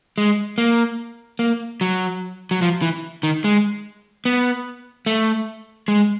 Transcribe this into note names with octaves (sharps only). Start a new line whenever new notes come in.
G#3
A#3
A#3
F#3
F#3
F3
E3
D#3
G#3
B3
A3
G#3